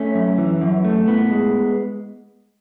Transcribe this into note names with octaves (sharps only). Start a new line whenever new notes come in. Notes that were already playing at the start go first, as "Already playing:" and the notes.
Already playing: A3 C#4
F#2
E3
F#2
A3
A2 B3
G#3